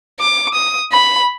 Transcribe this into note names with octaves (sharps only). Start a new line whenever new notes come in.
D6
D#6
B5